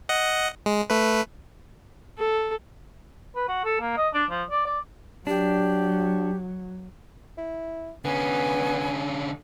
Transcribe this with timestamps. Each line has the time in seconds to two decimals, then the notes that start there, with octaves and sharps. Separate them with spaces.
0.09 D#5 F#5
0.66 G#3
0.90 A3 B4
2.18 A4
3.35 B4
3.48 F#4
3.65 A4
3.81 A#3
3.97 D#5
4.14 D4
4.30 F3
4.51 D5
4.66 D5
5.27 F#3 D4 G4
7.38 E4
8.05 D3 B3 C#4 G#5